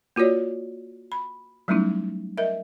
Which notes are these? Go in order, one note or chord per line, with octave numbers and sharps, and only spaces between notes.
A#3 F4 F#4 C#5 D5
B5
F#3 G3 A3 C#4 D#4 E4
A#4 D#5 E5